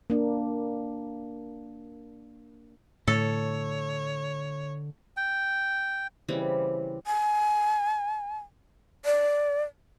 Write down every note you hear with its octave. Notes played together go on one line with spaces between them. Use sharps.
A#3 D4
A2 D3 A4 C#5
G5
C#3 E3 G3 C4
G#5
D5